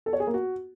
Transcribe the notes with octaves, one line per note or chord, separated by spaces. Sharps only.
A4
C#5
G#4
A#3
F#4